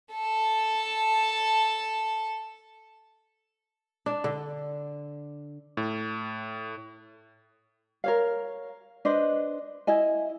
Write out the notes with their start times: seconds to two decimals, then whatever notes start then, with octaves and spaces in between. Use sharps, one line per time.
0.14 A4 A5
4.06 D4
4.24 D3
5.77 A2
8.04 A#4 C#5 F5
9.05 D4 B4 C5 D#5
9.87 E4 D#5 G#5